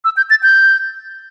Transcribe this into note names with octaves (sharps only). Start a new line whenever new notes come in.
E6
G6
A6
G6